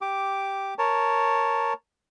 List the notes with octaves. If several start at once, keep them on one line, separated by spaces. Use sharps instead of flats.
G4 D6
A#4 C#5 A5